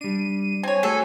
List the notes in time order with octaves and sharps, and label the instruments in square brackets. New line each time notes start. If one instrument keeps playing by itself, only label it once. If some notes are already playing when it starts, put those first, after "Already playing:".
[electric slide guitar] G3 D4 [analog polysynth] D#7
[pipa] C4 C#5 [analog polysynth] G#5
[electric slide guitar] A3 F#4 G#4 [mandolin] A4